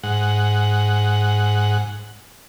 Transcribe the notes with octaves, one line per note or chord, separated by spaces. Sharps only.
G#2 F#5